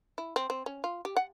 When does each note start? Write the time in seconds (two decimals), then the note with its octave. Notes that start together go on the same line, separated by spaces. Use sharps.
0.18 E4
0.36 C4
0.50 C4
0.66 C#4
0.84 F4
1.05 G4
1.16 F#5